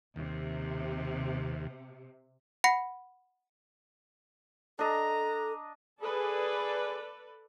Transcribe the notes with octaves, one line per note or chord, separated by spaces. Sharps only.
D#2 C3
F#5 B5 A#6 C#7
D4 A4 D#5 A#5
G#4 A4 B4 D5